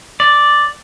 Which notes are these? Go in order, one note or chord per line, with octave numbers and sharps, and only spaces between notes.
D5